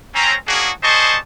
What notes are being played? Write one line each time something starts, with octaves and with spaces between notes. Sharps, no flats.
C4 C#4 A#5
A#3 C#4 D4 F#4 G#4
G3 G#4 C5 D#5 A5 C#6